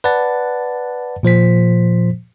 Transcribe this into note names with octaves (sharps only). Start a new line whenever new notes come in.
B4 D5 F#5 A5 A6
A#2 F3 C5 B6